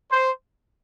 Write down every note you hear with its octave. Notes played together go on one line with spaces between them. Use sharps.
C5